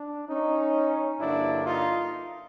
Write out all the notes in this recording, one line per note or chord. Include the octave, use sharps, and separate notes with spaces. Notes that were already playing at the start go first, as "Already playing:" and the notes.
Already playing: D4
C#4 D#4
G2 D3 F#3 A#3 D4 E4
D#4 F4